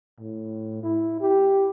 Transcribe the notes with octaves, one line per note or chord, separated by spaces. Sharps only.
A2
E4
G4